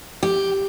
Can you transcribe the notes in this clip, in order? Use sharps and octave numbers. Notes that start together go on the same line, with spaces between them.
G4